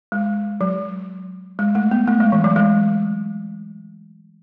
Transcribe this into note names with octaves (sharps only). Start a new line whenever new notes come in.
G#3
F#3
G#3
A3
B3
A3
G#3
E3
F#3
G#3